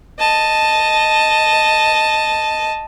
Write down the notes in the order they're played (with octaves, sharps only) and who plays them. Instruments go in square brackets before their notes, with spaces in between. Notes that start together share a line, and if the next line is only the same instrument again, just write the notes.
[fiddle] D#5 A5